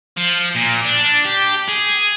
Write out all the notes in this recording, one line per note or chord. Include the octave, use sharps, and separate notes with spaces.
F3
A#2
D4
G4
G#4